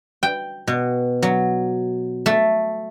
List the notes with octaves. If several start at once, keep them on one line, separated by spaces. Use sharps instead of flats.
G5
B2
F#3
A3